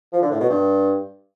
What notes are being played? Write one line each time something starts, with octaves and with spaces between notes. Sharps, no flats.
F3
D3
A2
B2
G2